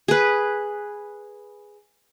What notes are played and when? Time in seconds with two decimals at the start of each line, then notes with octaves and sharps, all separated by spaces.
0.08 G#4 B4